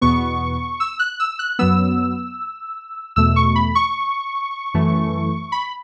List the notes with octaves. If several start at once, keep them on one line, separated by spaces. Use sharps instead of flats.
E2 B2 B3 C#6
E6
F#6
E6
F#6
F#2 F#3 B3 E6
E2 B2 A3 E6
C#6
B5
C#6
F#2 E3 A3
B5